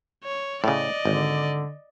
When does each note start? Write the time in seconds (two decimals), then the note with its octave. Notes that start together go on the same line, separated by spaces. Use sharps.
0.24 C#5
0.64 A2 C#3 D5 D#5
1.05 G#1 D3